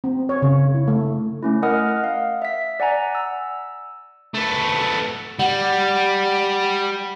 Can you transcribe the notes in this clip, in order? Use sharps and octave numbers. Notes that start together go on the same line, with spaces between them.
C4
C#5
C#3
E4
A3
A3 C#4 E4
A#4 D#5 F#5 D#6 F6
F5
E5 B6
D5 F#5 G#5 A#5
E6
A3 B3
G3 F#5